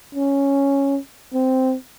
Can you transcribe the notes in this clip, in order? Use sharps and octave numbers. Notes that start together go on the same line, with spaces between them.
C#4
C4